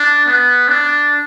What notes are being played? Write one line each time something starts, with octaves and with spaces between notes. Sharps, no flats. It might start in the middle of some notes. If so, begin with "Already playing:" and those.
Already playing: D4
B3
D4